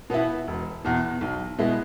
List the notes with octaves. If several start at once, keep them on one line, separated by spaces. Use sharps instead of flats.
B2 B3 E4
E1
E2 B2
B1
B2 G#3 E4